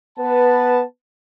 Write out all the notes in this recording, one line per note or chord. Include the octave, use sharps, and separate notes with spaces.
B3 B4 A5